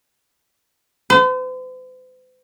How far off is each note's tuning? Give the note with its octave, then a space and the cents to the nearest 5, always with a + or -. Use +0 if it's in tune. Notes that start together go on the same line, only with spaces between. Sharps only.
C5 -45